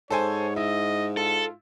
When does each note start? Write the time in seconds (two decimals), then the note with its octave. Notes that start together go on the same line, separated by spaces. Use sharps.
0.10 G#2 A4 C5 C#5 G#5
0.56 E4 D#5
1.17 F4 A4